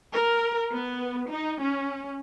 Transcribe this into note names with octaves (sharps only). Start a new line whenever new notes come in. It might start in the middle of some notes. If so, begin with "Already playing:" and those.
A#4
B3
D#4
C#4